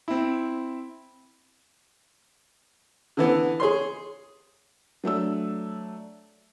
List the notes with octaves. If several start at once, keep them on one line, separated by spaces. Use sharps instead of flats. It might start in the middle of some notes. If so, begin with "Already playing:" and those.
C4 E4
D3 E3 B3
G#4 C#5 C6
F#3 A3 D4 E6